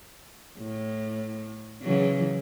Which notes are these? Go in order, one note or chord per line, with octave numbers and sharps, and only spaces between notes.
A2
C#3 E3 F#3